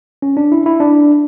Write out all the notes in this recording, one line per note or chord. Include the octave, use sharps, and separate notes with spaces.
C#4
D4
E4
E4
D4